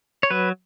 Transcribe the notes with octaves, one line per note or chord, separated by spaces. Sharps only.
C#5
F#3 B4